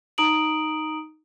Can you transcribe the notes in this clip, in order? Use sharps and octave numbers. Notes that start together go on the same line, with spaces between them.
D#4 A#5 D#6 D7 F#7